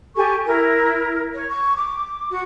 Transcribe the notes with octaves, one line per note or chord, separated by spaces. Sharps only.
G4 A4 G#5 C#6
E4 A#4
C#5
C#6
D6
F#4